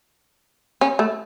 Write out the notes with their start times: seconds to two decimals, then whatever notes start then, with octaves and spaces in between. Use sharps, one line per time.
0.81 C#4
0.99 A3